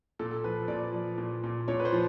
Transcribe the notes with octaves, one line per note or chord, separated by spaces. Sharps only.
A#2 A4
A4
F3 B4
A#2 D5
F3
A#2
A#2
A#2 C#5
B4
C5
F3